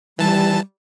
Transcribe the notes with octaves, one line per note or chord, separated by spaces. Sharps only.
E3 G3 A5